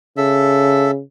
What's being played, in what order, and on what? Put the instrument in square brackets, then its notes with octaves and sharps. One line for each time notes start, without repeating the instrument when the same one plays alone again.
[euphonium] C#3 [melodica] A4 E5